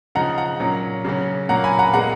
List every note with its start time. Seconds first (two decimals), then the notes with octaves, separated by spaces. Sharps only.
0.15 C#3 F3 G#3 D#4 F#5 A#5
0.38 F#5 A#5
0.60 A#2 F#3 C#4
1.05 C#3 F#3 C#4
1.49 A#2 F#3 A#3 C#4 F#5 A#5
1.64 G#5 B5
1.79 F#5 A#5
1.93 A#2 G#3 B3 F#5 A#5